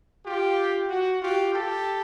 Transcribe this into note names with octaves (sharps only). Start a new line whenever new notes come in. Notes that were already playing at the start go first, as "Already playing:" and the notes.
F4 G4
F#4
F4 G4
G4 A4